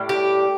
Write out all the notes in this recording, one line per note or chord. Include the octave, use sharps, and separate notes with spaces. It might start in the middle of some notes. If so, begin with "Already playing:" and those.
Already playing: A2 G3
G4